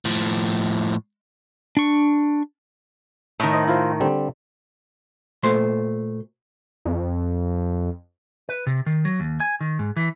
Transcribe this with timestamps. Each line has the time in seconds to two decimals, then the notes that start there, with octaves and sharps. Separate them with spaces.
0.05 A2 F3
1.77 D4 C#6
3.40 A2 D#3
3.53 C5 D#5
3.68 E4 F4 C5
4.00 D3 G3 C4
5.43 A#2 A3 C5 C6
6.85 F2
8.49 B4
8.67 C3
8.86 D#3
9.05 F#3
9.20 D#2
9.40 G#5
9.61 D#3
9.79 G#2
9.96 E3